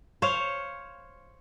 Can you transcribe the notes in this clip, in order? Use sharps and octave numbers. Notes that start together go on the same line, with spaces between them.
C5 C#5 F5